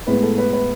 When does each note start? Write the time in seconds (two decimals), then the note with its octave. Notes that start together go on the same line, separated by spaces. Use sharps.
0.07 A2 G#3 B3 B4
0.23 A4
0.38 B4
0.53 B4